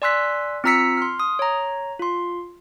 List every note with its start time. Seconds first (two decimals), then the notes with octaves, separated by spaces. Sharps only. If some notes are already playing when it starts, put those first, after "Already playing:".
0.02 D5 G#5 C6 E6 F#6 B6
0.64 C4 F4 A#5 E6 B6 C#7
0.97 C6 F6
1.20 D#6
1.39 C#5 A#5
2.00 F4 C6